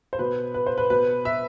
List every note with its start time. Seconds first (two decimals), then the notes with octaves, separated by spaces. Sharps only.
0.13 C5
0.19 B2 B4
0.54 B4
0.66 C5
0.78 B4
0.90 B2 B4
1.25 E5